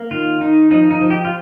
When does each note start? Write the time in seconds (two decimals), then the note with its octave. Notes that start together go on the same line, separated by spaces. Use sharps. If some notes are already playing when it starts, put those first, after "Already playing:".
Already playing: A#3
0.11 D#3 F4
0.41 D#3 D#4
0.71 F3 D#4
0.91 D#4
1.01 F3
1.10 G4
1.25 F4